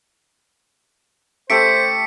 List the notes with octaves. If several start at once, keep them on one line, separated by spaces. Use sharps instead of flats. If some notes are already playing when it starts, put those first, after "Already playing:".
A3 G4 A4 C5 B6 C#7 D7